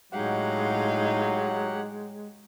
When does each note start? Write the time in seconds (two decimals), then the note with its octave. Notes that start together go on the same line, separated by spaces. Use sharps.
0.12 A2 F#3 G#3 D#4 G4 F5 F#5